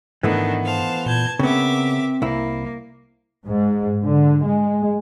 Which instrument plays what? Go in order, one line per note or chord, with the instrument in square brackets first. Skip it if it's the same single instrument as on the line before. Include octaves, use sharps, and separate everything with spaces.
[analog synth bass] G#2 [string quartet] D#3 D4 [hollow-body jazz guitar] E3 A3 B3
[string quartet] C5 F5 A5
[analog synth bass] A#2 [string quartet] A5 G6 G#6
[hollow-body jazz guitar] C#3 B3 [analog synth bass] C4 [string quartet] A#4 E5 D6
[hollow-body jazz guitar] C2 E4 [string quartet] A#3
[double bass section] G#2
D3
G#3